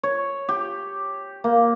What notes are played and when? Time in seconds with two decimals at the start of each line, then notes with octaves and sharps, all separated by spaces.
0.03 C#5
0.49 G4
1.44 A#3